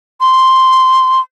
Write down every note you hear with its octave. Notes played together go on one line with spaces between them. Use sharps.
C6